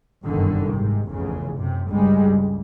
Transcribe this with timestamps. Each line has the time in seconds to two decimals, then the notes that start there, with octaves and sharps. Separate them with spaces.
0.25 G1 C2 F#2 D3 D#3
0.71 G#2 C3
1.10 F1 B1 E2 C#3
1.56 F#2 C3
1.90 G1 C#2 G3 G#3
2.25 C#2